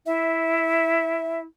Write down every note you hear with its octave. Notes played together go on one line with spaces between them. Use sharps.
E4 E5